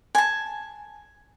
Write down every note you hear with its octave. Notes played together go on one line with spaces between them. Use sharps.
G#5 A5